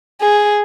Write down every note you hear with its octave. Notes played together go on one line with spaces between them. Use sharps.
G#4